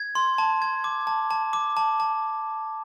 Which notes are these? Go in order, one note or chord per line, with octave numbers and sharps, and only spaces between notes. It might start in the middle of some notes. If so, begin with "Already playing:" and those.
Already playing: G#6
C6
A5
G#6
D6
A5
A5
D6
A5
A5